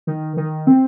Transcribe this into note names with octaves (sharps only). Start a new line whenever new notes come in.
D#3
D#3
C4